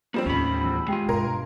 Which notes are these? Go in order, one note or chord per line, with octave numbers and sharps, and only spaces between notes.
F3 G3 A#3 C4 C5
D#2 A2 C#4 B5
E2 B5 E6
G#3 F4 G4 G5 C7
G2 B2 A#4 A#5 C6 G#6